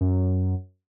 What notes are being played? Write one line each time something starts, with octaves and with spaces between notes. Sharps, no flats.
F#2